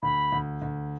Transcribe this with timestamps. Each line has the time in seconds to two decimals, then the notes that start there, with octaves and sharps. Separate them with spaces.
0.03 D2 B5
0.32 D2
0.62 D2